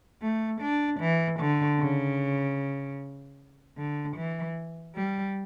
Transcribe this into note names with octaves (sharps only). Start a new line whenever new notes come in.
A3
D4
E3
D3
C#3
D3
E3
G3